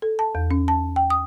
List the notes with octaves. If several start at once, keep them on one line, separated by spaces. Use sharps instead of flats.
A4
A5
E2
C#4
A5
G5
D#6